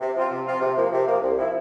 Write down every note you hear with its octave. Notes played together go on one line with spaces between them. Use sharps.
C3
F3 C4 F4
C3
F3 C4 F4
C3
F3 A#3
C3
F3 A#3
C2
C3 F3 C4 E4